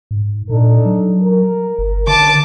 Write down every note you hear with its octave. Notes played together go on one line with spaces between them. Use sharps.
G#2
A#2 D4 D#4 A4
F#3
A#4
G1
D3 A5 D6